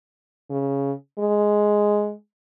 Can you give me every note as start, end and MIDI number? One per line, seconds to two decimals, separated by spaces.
0.50 0.93 49
1.19 2.13 56